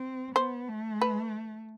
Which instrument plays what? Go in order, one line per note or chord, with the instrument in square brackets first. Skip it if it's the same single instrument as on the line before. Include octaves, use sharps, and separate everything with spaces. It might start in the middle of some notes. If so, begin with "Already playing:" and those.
Already playing: [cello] C4
[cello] B3 [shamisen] C5
[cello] A3
[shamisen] B4